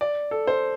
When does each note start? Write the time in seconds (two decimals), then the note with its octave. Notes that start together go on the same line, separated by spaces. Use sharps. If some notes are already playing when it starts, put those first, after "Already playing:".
0.01 D5
0.31 A4
0.47 C5